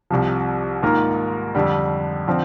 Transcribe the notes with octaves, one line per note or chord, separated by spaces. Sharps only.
C2 C3 F3
G#2 D#3 A#3 F4 A#4
F2 D3 G3
D3 F3 C4